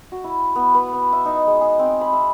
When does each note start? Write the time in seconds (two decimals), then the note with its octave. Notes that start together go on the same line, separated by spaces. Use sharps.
0.12 F#4
0.24 E4
0.56 B3
0.74 B4
0.93 B3
1.13 E5
1.25 D#4
1.47 G#3
1.61 G#4
1.79 C4
2.01 B5
2.13 E5